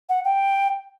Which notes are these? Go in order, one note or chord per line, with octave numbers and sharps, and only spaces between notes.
F#5
G5